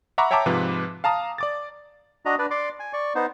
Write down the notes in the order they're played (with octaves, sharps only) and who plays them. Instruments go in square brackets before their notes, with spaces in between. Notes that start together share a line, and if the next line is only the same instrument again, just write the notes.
[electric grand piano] E5 F#5 A#5 B5 C#6 D6
C#5 E5 G5 A5 A#5 D6
G#2 C3 F3 B4
F5 A5 A#5 D#6
D5 D6 A6
[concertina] D4 F#4 D#5 A#5
D4 B4 D5
D5 C6 D6
G#5
D5 C#6
B3 D#4 C5